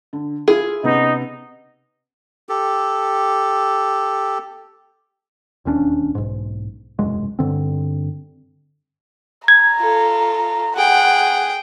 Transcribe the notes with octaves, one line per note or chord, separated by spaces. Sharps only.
D3
E4 F4 G#4
C3 B3 C#4 D#4
G4 A4
E1 D#2 C#4 D4
B1 G#2
E1 C2 F#2 G#3
G2 D3 C4
A#5 G#6
F4 A4
G#4 F#5 G5